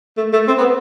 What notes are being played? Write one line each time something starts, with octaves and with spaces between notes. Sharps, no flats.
A3
A3
C4
B3